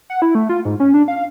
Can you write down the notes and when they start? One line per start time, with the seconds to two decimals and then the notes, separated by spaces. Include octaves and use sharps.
0.10 F#5
0.22 E4
0.35 A3
0.49 F4
0.65 G#2
0.80 C#4
0.94 D4
1.08 F5